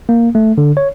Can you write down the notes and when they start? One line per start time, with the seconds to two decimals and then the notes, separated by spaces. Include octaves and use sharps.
0.09 A#3
0.35 A3
0.58 D3
0.77 C#5